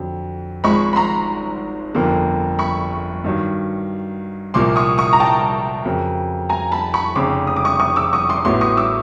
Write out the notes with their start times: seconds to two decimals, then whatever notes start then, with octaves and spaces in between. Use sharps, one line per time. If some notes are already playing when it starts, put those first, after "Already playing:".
Already playing: F2 D3 F#3
0.64 G#1 G#2 F3 G#3 B5 C#6
0.93 B5
0.96 A#5 C6
1.95 G1 F2 D3 F3 A#3
2.59 B5 C#6
3.24 G2 D#3 F#3
4.54 C2 A#2 F3 A#3 C6 D6
4.76 C#6 D#6
4.98 C#6 D#6
5.13 A#5
5.20 G5 A5
5.85 F2 C#3 F#3 A#3
6.49 G#5 A#5
6.72 A5 B5
6.94 B5 C#6
7.15 F1 F2 C#3 C6 D6
7.47 D#6
7.56 D6
7.65 C#6 D#6
7.80 C#6 D#6
7.96 D6 E6
8.13 C#6 D#6
8.29 C6 D6
8.45 A1 A2 F#3 B3 E4 C6 D6
8.61 C#6 D#6
8.77 D6 E6